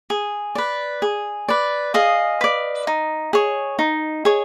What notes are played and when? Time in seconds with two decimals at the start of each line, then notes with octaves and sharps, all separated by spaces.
0.10 G#4
0.55 B4 D5
1.02 G#4
1.49 B4 D5
1.94 G#4 D#5 F5
2.41 B4 D5
2.87 D#4
3.33 G#4 C#5
3.79 D#4
4.25 G#4 C#5